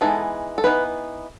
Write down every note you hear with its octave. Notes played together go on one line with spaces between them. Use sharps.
E3 G#3 B3 D#4 A4
A4
E3 B3 D#4 B4